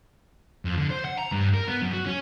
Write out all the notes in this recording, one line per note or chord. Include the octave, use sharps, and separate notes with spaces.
F2
D3
C5
F#5
A#5
G2
A#4
B3
F#2
F#4
C#4